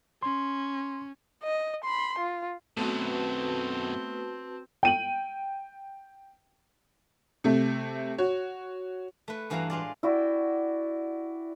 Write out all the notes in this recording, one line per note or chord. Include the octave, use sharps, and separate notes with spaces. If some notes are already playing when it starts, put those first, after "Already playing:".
C#4 C6
D#5
B5 C6
F4
F#2 B2 A3 B3 C4 F#4 B4 A5
G5 D#7 F#7
C3 A3
F#4 C#5
A3 B4
G2 E3 F#4 F5 F#5 A#5
A2 G#3 F4 D5
E4 F#4 D5 G5